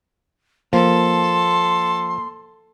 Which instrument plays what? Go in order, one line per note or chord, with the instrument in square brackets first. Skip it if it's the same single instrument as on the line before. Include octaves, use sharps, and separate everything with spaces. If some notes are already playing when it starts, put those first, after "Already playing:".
[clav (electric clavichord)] F3 [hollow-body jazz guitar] A#3 [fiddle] A4 [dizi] C6